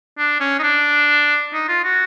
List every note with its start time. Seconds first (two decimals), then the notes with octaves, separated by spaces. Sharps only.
0.18 D4
0.40 C#4
0.59 D#4
0.63 D4
1.53 D#4
1.68 F4
1.84 F#4